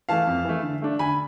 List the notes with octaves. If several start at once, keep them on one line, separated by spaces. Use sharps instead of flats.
E3 A3 F5 A5
F2
E3 A3
D3
A3 D4
D3 G#5 B5